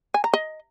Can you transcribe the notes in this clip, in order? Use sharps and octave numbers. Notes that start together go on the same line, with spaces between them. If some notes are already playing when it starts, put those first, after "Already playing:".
G#5
A#5
D#5